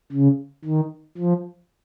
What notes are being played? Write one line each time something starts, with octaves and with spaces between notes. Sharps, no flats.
C#3
D#3
F3